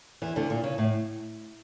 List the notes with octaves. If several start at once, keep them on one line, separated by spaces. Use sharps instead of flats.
E2 E3
D2 D3
A#2
C#3
A2